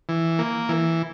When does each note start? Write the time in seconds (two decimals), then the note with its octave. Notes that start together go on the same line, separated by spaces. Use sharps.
0.09 E3
0.39 A#3
0.69 E3